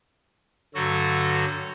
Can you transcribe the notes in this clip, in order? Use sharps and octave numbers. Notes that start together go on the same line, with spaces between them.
G2 D3 F#3 F#4 A4